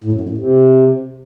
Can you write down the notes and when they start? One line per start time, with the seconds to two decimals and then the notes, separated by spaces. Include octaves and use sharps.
0.04 A2
0.12 F#2
0.21 F2
0.29 A2
0.37 C3